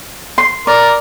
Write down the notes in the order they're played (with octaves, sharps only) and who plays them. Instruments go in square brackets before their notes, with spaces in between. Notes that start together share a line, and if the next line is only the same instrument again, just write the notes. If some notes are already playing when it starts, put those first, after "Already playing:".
[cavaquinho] C6
[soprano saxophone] A#4 [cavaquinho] D5